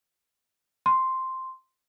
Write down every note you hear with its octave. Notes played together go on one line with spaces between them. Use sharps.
C6